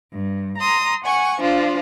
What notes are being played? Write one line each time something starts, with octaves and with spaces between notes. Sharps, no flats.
G2
A#5 C6 D#6
F#5 G#5 C#6
F3 D4 F4